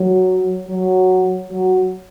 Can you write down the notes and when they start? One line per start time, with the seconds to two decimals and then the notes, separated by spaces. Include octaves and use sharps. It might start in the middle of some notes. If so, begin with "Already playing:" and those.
Already playing: F#3
0.67 F#3
1.50 F#3